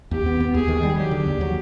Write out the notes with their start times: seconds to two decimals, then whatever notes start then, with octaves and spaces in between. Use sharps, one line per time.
0.11 D#2 G4
0.26 B3
0.40 B3
0.54 D#2 G#4
0.68 D#3
0.83 G3
0.98 F#3 G4
1.11 D3
1.26 D#2
1.41 F#3